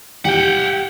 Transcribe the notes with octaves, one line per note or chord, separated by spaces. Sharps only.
G4 F#5 G5